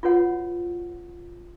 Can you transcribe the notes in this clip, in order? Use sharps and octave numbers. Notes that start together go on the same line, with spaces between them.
F4 F#4 B4 C#5 F#5